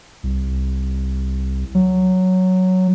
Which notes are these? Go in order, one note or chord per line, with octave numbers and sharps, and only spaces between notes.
C2
F#3